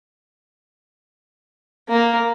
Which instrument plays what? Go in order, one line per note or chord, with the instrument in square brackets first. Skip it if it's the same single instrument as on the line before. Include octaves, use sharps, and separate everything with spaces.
[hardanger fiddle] A#3